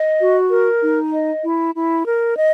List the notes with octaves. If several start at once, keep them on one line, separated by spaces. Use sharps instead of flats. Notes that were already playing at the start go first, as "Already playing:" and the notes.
Already playing: D#5
F#4
A#4
D#4
D#5
E4
E4
A#4
D#5